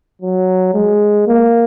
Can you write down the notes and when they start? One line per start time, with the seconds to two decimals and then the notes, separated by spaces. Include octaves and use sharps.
0.22 F#3
0.74 G#3
1.28 A#3